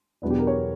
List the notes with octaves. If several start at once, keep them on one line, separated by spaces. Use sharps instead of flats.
E2 B2 F#3 B3 D4
G4
A#4
C#5